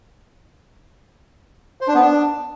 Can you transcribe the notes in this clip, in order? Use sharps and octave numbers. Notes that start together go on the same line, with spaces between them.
C5
D4
B3
D4